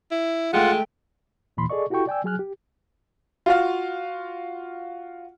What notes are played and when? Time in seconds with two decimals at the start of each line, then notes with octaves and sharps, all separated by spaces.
0.11 E4
0.53 G#3 A3 F4 F#5 G5
1.57 D#2 A#2 E3 B5 C6
1.70 G#4 A4 D5 D#5 C#6
1.90 E4 F#4 G4 A4 G5 C#6
2.07 D5 G5 G#5 E6
2.24 F#3 G#4 G#5 F6 F#6
2.39 G4
3.46 F4 F#4 F5